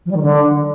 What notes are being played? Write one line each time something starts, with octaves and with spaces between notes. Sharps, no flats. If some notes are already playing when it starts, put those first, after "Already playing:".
F3
G3
D#3
D3